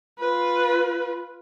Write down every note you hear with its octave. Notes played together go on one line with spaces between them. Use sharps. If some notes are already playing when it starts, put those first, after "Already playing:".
F4 B4